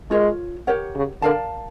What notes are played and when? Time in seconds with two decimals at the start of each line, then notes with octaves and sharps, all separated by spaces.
0.11 G#3 F4 A#4 C#5
0.67 G4 A#4 C#5 F#5
0.95 C#3
1.22 D3 A#4 D5 F5 A5